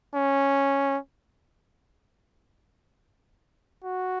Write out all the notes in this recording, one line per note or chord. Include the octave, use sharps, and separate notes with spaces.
C#4
F#4